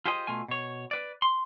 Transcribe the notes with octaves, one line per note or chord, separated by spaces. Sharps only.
F4 G4 G#4 C5 D#5
B2 A3 F4 G#5
B2 C#5
B4 D5
C6